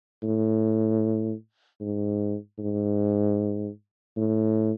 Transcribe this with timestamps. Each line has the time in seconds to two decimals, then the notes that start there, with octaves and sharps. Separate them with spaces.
0.23 A2
1.81 G#2
2.59 G#2
4.17 A2